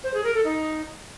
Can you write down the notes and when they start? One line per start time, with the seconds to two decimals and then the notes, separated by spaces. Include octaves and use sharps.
0.04 C5
0.14 G#4
0.24 A#4
0.34 A4
0.45 D#4